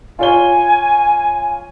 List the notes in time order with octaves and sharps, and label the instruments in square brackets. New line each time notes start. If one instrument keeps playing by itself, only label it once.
[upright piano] F4 C#5 G7 [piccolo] G#5